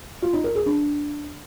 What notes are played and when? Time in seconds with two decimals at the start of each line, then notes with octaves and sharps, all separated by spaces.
0.22 F4
0.33 D#4
0.44 A#4
0.55 G#4
0.66 D4